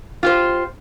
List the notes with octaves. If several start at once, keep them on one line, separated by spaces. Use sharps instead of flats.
F4 G4 C5